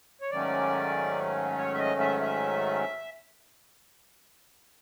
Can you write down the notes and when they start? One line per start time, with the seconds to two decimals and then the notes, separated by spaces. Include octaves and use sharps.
0.21 C#5
0.31 G#2 D#3 F#3 A3 C#4 D5
1.58 C#5
1.74 E5
1.79 D#5
2.00 E5
2.21 E5